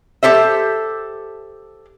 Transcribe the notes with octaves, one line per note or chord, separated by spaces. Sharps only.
G4 A4 C5 E5